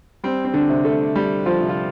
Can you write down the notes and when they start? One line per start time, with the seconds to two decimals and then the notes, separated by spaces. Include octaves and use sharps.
0.24 G3 C4
0.45 C4
0.54 D3 D4
0.69 C3
0.85 A3 A4
1.15 G3 G4
1.46 F3 F4
1.61 C3
1.69 F4